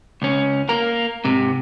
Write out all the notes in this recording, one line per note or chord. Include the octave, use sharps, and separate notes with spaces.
C#2 C#4
A#3 A#4
G#2 C3